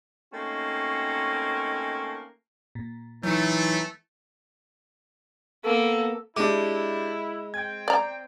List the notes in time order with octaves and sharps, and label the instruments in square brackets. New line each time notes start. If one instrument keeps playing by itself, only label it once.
[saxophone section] A3 A#3 C4 C#4 D#4 F#4
[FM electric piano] A#2
[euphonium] E3 [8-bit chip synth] F#3 D#4 [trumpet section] A3
[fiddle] A#3 [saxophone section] B3 A4
[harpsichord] G#3 [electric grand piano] D4 G4 D6 [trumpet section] E4
[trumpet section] C4 G5 [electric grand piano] G#6
[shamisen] D5 A#5